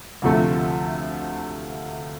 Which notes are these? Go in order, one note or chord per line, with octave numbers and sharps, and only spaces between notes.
D2 C3 F3 A3